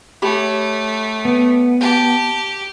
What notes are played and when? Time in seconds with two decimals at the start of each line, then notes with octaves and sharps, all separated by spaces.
0.22 A3 G4 C#5 B5
1.25 B3
1.81 G4 G5 A5